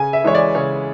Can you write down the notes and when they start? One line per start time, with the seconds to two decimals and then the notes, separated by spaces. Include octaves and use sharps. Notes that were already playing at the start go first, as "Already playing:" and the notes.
Already playing: C#3 G#5
0.13 E5
0.24 E3 G#3 C#5
0.35 D5
0.55 C#3 C#5